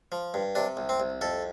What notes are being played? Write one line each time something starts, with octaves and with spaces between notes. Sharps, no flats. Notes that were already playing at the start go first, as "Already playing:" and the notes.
F3
G2
C3 D4
C2
C4
C2
F2 A4